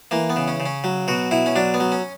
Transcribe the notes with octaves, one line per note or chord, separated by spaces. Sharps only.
E3 A#3
B3
C#3
C#4
C#3
C#4
F#3
B2 F#4
B2 E4
C#4
F#3 D4
B3
F#3
C#4